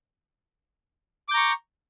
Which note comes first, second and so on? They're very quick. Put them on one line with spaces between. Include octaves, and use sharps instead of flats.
D6 G6 A#5 C#6